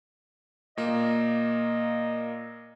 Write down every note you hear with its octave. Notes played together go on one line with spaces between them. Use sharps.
A#2 A#3 D#5